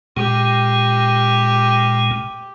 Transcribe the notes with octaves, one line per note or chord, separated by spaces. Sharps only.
A#2 G#3 G4